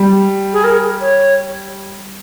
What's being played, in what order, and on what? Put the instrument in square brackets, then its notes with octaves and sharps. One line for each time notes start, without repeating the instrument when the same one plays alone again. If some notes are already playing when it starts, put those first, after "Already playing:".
Already playing: [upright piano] G3
[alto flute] G#4
A#4
C#5